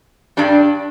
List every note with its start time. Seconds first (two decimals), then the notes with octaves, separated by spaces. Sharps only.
0.37 G2 G3 D4